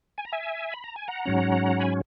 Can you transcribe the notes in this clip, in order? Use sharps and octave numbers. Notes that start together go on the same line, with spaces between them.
G#5
A#5
E5 G#5
B5
A#5
G#5
F#5 A#5
G#2 F#3 C#4
G#5 B5